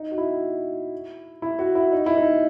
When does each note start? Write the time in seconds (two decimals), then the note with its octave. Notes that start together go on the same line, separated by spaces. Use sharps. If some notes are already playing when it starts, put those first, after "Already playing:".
Already playing: D#4
0.11 F#4
0.18 E4
1.42 E4
1.59 F#4
1.75 E4
1.92 D#4
2.06 E4
2.17 D#4